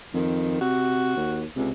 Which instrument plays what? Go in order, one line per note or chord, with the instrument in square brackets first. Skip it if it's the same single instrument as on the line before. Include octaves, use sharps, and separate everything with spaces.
[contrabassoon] F2 [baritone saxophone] D#3
[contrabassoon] C3 [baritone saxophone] F#4
[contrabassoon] D#2
[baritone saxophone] C#2 [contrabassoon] C3